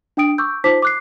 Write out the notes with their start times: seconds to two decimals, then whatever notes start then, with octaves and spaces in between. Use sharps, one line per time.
0.17 D4 G5 D#6 D7
0.38 C#6 D6 E6 G6
0.64 D#4 F4 C5 A5 D6 B6
0.82 D6 F#6 C7